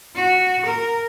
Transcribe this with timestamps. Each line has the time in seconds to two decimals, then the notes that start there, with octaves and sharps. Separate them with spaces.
0.16 F#4
0.66 A#4